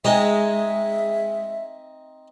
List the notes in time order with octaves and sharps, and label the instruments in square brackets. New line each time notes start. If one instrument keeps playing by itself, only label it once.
[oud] G#3 [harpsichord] C4 D#4 [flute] E5